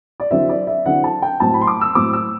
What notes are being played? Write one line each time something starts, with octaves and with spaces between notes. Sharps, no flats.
D5
D3 F#3 C4 E4 E5
D5
E5
D3 F#3 C4 E4 F#5
A5
G5
A2 F#3 C4 A5
B5
C6
D6
E6
A2 F#3 C4 D6
E6